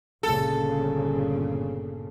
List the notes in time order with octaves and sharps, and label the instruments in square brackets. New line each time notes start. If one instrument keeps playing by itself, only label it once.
[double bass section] G1 A#2 C#3 [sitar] A4